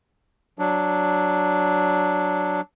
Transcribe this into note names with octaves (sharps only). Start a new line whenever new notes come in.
F#3 D4